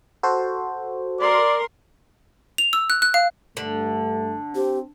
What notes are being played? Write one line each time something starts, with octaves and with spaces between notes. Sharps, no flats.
F#4 A4 C5
A#4 D5 C6
F7
E6
F#6
F#6
F5
G2 D3 A3
C4 G4